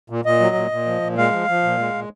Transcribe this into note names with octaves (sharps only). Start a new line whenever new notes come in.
A#2
A#2 D#5
F#3
A#2
A#2
F3
A#2
G#3 F5
F3
F3
A#2
G#3
A#2